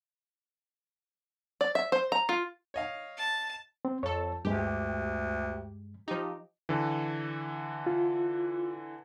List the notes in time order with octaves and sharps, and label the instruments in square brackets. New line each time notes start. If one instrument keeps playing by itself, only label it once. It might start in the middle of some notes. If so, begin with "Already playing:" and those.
[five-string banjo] D5
E5
C5
A#5
F4
[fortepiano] C#5 D#5 F5
[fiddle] A5
[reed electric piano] C4
[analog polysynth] F2 A4 [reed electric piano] C#5
[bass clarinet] D2 [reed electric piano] G2 G#3 [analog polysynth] G4
[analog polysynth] F3 D#4 [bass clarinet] G4
[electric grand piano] D3 E3
[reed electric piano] F4